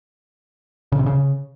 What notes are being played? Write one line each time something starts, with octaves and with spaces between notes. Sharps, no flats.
C#3
C3
C#3